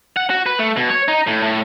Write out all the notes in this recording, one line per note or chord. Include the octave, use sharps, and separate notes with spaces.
F#5
F#4
B4
A3
B2
C#5
D#4
A2
A2